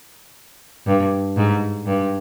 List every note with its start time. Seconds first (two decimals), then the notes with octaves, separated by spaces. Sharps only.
0.87 G2
1.37 G#2
1.86 G2